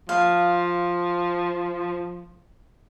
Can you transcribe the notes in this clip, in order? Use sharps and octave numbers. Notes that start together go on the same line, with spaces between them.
F3 F5